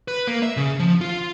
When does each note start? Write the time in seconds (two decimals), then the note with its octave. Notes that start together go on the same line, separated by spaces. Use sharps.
0.08 B4
0.27 A#3
0.43 E5
0.57 C#3
0.79 F3
1.01 F4